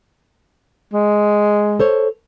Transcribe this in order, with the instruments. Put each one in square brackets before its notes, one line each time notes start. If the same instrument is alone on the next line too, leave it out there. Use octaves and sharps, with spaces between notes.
[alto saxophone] G#3
[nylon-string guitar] A4 C5 C#5